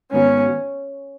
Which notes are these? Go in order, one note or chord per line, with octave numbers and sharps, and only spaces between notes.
G#2 D#3 B3 C#4 F#4